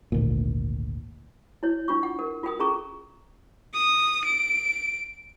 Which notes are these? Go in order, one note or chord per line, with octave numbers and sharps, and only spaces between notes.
G#1 D2 A#2
E4 C#5
D4 F4 C#6
F#5
A#4
F4 A#4 G5 D#6
C#4 G#4 A4 A#5 C#6
D#6
D7